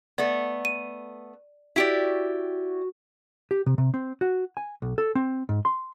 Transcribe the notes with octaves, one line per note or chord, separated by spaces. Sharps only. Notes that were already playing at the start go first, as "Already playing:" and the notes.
A3 B3 D5
D#7
E4 F#4 G4 D5 B6 D7
G4
C3
C3
C4
F#4
G#5
B1
A4
C4
G#2
C6